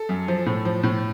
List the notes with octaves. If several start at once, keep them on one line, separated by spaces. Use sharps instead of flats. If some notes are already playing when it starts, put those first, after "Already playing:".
Already playing: A4
F#2
F3
A2
F3
A2